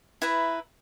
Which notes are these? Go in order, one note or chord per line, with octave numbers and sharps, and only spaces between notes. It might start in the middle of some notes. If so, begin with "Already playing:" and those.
E4 B4 E5 A#5